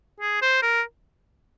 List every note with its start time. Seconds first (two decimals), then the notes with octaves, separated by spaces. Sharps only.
0.20 G#4
0.42 C5
0.63 A#4